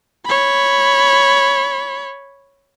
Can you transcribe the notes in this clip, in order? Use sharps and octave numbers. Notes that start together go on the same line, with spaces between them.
C#5 B5